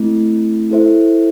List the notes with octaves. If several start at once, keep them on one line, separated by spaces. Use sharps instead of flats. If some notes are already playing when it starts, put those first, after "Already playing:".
Already playing: A3 C4 E4
E4 A4 C5 E5